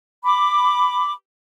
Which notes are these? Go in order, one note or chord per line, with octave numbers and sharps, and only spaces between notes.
B5 D6